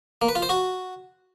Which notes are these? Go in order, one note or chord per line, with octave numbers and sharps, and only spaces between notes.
A#3
B4
F4
C5
F#4